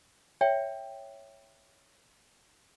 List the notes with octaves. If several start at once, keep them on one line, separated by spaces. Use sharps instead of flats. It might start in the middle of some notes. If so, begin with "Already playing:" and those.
C#5 E5 G5